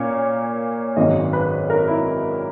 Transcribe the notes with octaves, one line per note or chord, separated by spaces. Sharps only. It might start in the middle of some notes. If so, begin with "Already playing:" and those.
Already playing: A#2 A#3 C#4 C#5
G#1 F#2 D#3 D#5
B4
A#4
E4